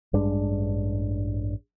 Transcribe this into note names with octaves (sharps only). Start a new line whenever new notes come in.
A1 G2 G#3 D4